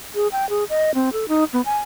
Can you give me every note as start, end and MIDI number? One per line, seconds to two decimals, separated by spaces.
0.15 0.28 68
0.32 0.48 79
0.50 0.64 68
0.69 0.94 75
0.94 1.10 60
1.13 1.28 69
1.28 1.44 63
1.53 1.61 59
1.65 1.76 80